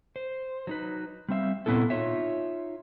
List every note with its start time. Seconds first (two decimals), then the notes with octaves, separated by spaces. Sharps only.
0.16 C5
0.67 F#3 D#4 B4
1.29 G3 C4 E5 F5
1.66 A#2 B3 C4 E4 A4
1.90 D#4 F4 C#5 E5